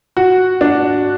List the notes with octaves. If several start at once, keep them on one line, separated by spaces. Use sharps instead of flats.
F#4
D4